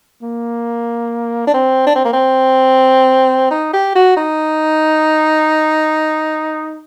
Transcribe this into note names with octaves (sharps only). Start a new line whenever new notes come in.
A#3
D4
C4
D4
C4
A#3
C4
D#4
G4
F#4
D#4